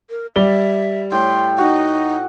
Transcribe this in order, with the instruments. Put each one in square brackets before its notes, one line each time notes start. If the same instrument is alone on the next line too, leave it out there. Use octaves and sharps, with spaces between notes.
[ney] A#4
[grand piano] G3 D5 G7 [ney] E5
[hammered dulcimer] A2 G5 [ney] C6
[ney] D#4 [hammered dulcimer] F#4